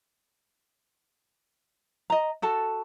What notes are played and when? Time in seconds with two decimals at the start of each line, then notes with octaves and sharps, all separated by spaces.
2.10 D#5 A#5
2.42 F#4 A4 A5